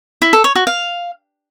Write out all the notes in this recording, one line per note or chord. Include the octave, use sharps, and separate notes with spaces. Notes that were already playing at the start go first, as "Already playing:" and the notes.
E4
A4
C#5
F#4
F5